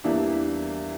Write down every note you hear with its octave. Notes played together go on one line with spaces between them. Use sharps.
E2 E3 G3 A#3 D4 E5